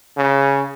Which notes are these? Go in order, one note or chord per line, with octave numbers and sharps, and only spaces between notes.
C#3